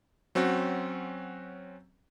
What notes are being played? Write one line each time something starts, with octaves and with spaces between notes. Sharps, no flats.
F#3 C4 C#4 F#4